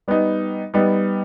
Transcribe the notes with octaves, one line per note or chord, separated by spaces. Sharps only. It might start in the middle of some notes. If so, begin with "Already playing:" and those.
G3 B3 D#4
G3 B3 D#4